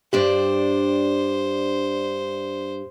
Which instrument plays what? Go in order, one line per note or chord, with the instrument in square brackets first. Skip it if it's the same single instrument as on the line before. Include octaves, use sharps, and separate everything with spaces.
[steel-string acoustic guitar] G2 D4 D5 [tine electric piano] G4 [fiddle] C5